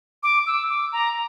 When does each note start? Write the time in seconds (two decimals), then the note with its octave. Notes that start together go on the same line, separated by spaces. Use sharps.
0.23 D6
0.47 E6
0.69 D6
0.93 A#5